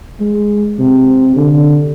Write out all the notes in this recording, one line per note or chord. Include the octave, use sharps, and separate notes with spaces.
G#3
C3
D3